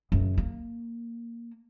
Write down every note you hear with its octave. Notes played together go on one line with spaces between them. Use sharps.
F#2 C#3
A#3